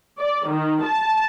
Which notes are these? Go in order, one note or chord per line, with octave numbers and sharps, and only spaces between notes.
D5
D#3
A5